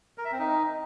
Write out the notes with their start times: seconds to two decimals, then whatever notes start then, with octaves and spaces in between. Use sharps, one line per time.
0.18 A#4
0.25 E5
0.32 C4
0.39 D#4